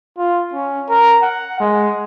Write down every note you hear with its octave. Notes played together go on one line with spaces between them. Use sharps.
F4
C#4
A#4
F#5
G#3